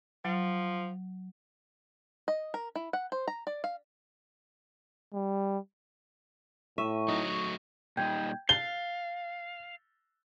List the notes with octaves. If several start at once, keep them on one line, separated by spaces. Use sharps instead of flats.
F3 F#3
D#5
A#4
E4
F#5
C5
A#5
D5
F5
G3
A2 E5 C#6
F#3 A3 D#4
A#2 G3 D#4 G5 G6 G#6
F5 A6 G7